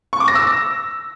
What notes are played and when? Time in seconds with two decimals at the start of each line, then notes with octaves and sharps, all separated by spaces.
0.13 C#6
0.20 D6
0.28 A#6
0.35 E6